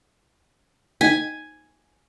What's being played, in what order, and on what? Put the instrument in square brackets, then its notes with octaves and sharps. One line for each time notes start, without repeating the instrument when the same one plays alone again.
[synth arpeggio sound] D#4 G#6 B6 [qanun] G#5